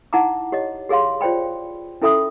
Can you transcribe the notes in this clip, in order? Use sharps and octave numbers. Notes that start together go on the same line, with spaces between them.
D#4 E4 F#5 A5 A#5 D6
G4 C#5 D#5
G4 G#4 C#5 F5 C6
F4 C5 D5 G5 B5
C#4 E4 A4 E5 B5 D#6